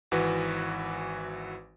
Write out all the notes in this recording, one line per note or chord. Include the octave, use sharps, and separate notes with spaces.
G#1 E3 F#4 B4